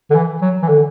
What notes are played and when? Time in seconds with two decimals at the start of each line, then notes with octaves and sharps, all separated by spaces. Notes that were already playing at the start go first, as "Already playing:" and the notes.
0.10 D3
0.15 E3
0.41 F#3
0.62 E3
0.69 D3